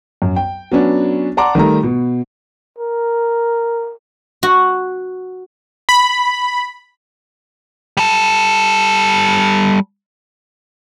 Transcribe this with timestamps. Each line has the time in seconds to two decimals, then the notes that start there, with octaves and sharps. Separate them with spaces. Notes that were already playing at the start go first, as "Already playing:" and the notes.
0.22 F#2
0.36 G5
0.72 F#3 B3 C#4 D4
1.37 D5 F#5 A5 A#5 C6 D6
1.55 D#3 G3 A3 A#5
1.83 B2
2.79 A#4
4.43 F#4
5.89 B5
7.97 G3 A4